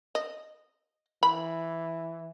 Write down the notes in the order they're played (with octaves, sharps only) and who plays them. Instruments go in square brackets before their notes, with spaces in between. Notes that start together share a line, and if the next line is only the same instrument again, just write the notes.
[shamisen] D#5
[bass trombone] E3 [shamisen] B5